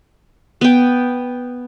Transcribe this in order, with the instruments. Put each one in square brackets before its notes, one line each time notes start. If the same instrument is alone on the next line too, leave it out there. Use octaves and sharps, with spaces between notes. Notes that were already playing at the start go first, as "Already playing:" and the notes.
[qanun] B3 G5